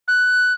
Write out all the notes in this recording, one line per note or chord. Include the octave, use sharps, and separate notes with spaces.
F#6